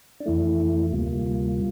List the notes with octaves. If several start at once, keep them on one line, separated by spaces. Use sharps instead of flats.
D4
F2 E3 A3 E4
D2 C3 G3 A#3 F4